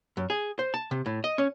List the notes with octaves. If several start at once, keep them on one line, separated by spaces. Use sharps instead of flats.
F#2
G#4
C5
A5
C3
A2
D#5
C#4